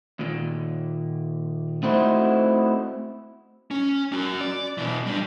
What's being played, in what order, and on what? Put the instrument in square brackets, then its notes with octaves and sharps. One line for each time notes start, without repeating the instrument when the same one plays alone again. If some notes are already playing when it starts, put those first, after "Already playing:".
[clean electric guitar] D#2 A#2
A3 C4 D#4 E4 F#4 C5
[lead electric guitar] C#4
C#4 F#4
D5
B2 E3
G3 D4